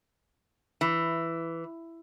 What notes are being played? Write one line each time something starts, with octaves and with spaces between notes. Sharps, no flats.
E3